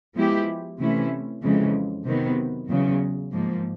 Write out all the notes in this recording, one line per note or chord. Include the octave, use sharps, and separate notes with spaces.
F3 G#3 B3 E4 G4
C3 E3 A3 C#4 E4
F2 C#3 E3 G#3
C3 D#3 F#3 B3
E2 C#3 F#3
G#2 F3 A#3